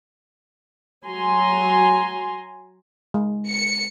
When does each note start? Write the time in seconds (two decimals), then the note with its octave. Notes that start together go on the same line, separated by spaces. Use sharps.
1.06 F#3 G#5 A#5 C6
3.14 G#3
3.50 C#7